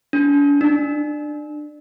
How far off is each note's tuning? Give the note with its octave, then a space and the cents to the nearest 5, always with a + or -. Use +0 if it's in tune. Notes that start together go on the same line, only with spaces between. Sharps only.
D4 -45
D4 +20